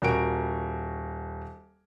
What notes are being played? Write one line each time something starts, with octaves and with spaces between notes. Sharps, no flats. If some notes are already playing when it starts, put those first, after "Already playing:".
D#1 F#4 A#4 D7